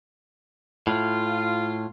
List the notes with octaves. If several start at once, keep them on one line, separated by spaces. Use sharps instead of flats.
A2 F4